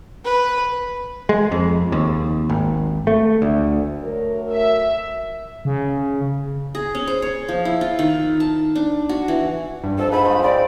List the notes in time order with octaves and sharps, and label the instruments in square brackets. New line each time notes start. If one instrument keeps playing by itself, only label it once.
[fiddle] B4
[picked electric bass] G#3
F2
D#2
G#1
A3
D2
[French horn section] F#3 A3 A#4
[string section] E5
[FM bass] C#3
[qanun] G#4
C#4
C5
C#5
F3
E4
F4
D#3
A5
D4
F#4
E3
[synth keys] G2
[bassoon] F2 [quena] A4
[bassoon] G#2 [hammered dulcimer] D#4 [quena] B5
[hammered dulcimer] F3
[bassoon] C4 [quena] D5